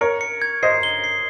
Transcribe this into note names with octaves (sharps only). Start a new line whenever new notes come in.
A#4 C#5 C#7
C#7
G#6
C5 D#5 C7
G7
C7